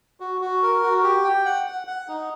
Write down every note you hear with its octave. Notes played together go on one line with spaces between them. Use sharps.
F#4
F#4
A#4
F#4
G4
G5
F#5
F#5
F#5
D#4